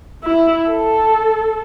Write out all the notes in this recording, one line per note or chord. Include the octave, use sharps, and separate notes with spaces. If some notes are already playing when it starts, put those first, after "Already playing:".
E4
A4